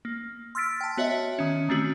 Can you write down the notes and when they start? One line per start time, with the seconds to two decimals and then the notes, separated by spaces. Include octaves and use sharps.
0.05 A#3
0.55 C6 E6 F6 A6 B6 D7
0.81 G5 A5
0.97 B3 F#4 C#5 D#5 E5
1.39 D#3 C#4
1.69 D#3 A3 C4 F#4